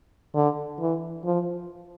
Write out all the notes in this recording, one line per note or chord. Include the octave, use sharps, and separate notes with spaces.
D3
E3
F3